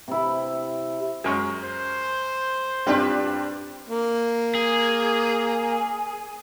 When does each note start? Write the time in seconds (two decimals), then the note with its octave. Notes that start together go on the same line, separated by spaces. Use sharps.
0.08 C3 E4
1.24 F#2 G#3 A#4 C#5
1.64 C5
2.87 G2 C4 D4 F4 G4 B4
3.88 A#3
4.55 G#4